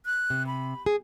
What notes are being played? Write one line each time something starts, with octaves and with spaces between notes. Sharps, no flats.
F#6
C3
B5
G#4